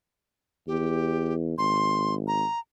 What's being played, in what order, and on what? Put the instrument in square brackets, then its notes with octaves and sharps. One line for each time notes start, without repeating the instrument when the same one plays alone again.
[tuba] E2 [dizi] G4
[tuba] G#1 [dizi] C6
[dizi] A#5